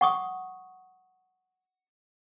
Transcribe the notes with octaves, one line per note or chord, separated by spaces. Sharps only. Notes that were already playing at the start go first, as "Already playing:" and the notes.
F#5 C#6 D#6